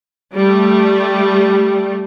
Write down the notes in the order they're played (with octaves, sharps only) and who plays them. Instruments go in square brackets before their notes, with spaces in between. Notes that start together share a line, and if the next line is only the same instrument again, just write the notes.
[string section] G3 A3